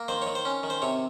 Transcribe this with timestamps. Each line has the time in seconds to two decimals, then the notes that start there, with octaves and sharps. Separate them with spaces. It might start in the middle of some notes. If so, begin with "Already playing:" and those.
Already playing: A#3
0.08 D#3 C5
0.22 C#5
0.27 D#3
0.35 C5
0.45 C#4
0.63 D#3
0.70 C5
0.82 C3 C#5